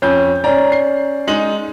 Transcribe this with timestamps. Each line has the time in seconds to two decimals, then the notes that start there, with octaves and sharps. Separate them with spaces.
0.02 F2 C#4 G6
0.44 C#4 D5 A#5
0.72 C7
1.27 G#3 D#4 F#7